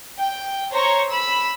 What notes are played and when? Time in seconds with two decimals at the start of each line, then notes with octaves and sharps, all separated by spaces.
0.17 G5
0.72 C5 C#5 A#5 C#6
1.10 B5 E6